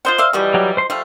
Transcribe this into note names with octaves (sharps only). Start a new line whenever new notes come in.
F4 C5 D#5 F#5
D5 E5 F5
E3 F3 G3 F#4 D#5
F#3 G4
C5 C6
F3 G3 A3 C5 F5